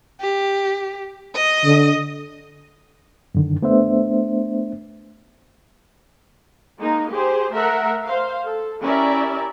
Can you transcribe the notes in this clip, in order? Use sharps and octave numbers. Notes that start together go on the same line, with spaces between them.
G4
D#5 D#6
D3
F#2 D3 D#3
A3 B3 D4 C5 E5
G#3 A#3 D#4
G4 G#4 C5
A3 A#4 E5 F#5
C5 F5
A4
C#4 E4 G4 A#4 D5 E5